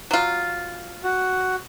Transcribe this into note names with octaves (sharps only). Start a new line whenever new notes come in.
F#3 F4
F#4